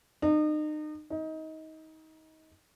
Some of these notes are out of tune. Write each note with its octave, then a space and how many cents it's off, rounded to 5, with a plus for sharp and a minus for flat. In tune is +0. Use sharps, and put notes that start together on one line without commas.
D#4 -35
D#4 +25